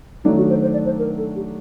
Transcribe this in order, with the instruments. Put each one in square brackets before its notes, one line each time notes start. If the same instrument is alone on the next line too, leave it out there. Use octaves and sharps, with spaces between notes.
[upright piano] D#3 F#3 A3 D4 [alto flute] D#4
[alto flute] F#4
C5
C5
D5
C5
A#4
A4
G4